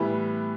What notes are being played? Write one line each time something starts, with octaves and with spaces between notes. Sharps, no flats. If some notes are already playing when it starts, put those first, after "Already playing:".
Already playing: A2 E3 G3 B3 E4